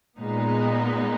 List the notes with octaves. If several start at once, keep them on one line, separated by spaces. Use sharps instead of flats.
A#2 G#3 B3 D#4